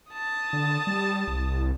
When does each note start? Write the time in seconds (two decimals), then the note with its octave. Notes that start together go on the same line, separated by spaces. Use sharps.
0.11 A5 D#6
0.53 D3
0.87 G3
1.28 C2